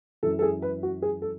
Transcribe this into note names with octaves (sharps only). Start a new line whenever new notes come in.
F#2 E3 A4
A4
G#4
B4
F#4
G#4
A4